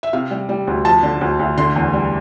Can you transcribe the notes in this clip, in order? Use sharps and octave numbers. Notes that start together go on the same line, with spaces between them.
E5
C3 F5
G3
G3
D2
F3 A5
D3
D2
D2
D3 C6
E2
G3